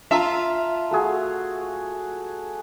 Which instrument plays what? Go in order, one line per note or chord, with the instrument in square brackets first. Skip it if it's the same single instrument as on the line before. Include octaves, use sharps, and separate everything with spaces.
[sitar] F4 E5 [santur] A5 A#5
[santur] A3 F#4 G#4